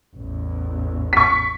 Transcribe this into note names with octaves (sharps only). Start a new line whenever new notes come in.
A1 E2
C#6 B6